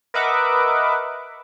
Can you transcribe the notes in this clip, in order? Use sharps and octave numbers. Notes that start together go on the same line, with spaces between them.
A#4 B4 D#5 E5 F#5 D6